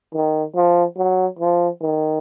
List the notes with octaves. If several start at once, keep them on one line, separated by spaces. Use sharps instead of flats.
D#3
F3
F#3
F3
D#3